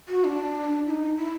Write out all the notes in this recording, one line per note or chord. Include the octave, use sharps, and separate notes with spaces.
F#4
D4
E4
D#4
E4